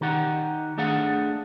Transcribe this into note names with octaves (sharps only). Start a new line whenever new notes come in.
D#3 D#4 G4 F#5
A3 D4 G#4 F5 F#5